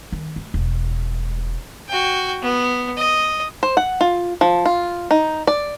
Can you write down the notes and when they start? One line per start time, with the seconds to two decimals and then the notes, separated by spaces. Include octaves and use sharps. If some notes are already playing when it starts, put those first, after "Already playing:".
0.12 D#3
0.36 A3
0.54 E1
1.88 F#4 G5
2.42 B3
2.97 D#5
3.63 C5
3.77 F#5
4.01 F4
4.41 F3
4.66 F4
5.11 D#4
5.47 D5